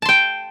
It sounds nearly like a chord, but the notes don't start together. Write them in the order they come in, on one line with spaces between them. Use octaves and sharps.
A5 C6 G5